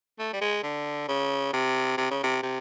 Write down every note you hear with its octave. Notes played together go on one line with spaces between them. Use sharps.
A3
G3
G#3
D3
C#3
C3
C3
C#3
C3
C3